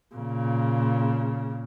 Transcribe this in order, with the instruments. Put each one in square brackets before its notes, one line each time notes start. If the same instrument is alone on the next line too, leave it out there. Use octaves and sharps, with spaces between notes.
[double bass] A#2 C#3